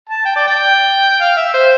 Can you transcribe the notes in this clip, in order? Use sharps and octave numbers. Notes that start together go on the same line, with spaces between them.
A5
G5
D5
G5
F5
E5
C5